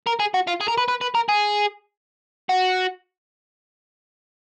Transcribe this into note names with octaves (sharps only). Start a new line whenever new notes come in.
A#4
G#4
F#4
F4
G#4
A#4
B4
B4
B4
A#4
G#4
F#4